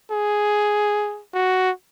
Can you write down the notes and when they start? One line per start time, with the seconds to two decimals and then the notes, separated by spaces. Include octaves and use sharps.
0.11 G#4
1.34 F#4